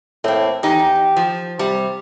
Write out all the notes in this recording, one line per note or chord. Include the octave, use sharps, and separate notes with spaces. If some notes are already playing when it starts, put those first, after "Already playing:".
A2 A#3 C4
E2 D#4 G4
F3
C3 G3